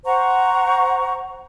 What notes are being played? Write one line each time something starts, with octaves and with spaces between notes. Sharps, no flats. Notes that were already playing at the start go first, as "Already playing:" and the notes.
C5 F#5 A#5 C#6